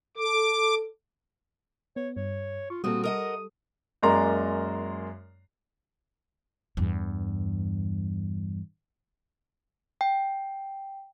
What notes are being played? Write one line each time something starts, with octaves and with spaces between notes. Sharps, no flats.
A4 D6
B3 C#5
G2 C#5
F4 C#6
A#2 G3 C4 F#4 A4 D#6
A#4 D#5 F#5 D#6
F#2 G#3 A#3 D5 A#5 C6
E2 G2
G5